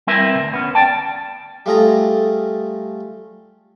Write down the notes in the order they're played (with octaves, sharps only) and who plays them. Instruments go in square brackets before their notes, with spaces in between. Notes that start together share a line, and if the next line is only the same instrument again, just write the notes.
[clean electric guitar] G3 C4 E4 A#4 B4 E5
D2 C3
B3 C#4
D5 G5 A5
[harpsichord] G3 A3 F4 G#4 A4 A#5